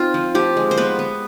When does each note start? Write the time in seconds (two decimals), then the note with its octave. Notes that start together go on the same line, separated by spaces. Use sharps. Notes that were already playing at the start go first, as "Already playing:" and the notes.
Already playing: C4 D#4 F4 C5
0.14 F3
0.35 F3 G4
0.57 G#3
0.71 C5
0.78 B3 B4
0.99 B3